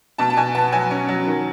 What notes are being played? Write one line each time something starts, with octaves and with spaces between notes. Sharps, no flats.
B2 A5
A5
B2 G#5
B3 A5
F#3 G#5
C#4
F#3
D#3